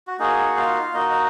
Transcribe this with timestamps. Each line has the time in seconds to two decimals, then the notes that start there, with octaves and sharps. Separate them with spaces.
0.07 F#4
0.19 A#3 D#4 F#4 G#4
0.46 F#5
0.56 F4 F5
0.93 A#3 D#4 F#4 D#5
1.11 D#5